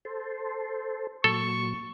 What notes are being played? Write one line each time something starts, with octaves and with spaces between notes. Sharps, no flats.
A4 C5
A#2 F#3 A4 C#6